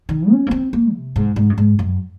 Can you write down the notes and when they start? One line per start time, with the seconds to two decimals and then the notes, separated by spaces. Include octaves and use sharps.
0.09 D#3
0.30 C#4
0.47 A#3
0.51 C4
0.73 A#3
0.93 C3
1.16 G#2
1.36 G#2
1.50 F#2
1.58 G#2
1.79 F#2